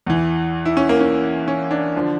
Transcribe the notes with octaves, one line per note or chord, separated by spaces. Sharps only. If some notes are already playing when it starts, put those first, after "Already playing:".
E2 E3
E4
C#4
A#3
C#4
C#4
D4
D3 F3